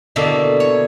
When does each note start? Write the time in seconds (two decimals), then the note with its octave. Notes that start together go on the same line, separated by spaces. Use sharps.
0.16 B2 D3 A#3 E4 A4
0.60 C#5